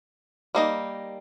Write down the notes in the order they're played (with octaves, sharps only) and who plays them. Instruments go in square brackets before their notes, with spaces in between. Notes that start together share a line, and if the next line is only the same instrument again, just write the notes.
[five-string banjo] G3 A#3 D#4